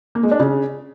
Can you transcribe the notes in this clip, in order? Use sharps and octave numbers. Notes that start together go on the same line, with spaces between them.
A#3
G#3
D4
C#3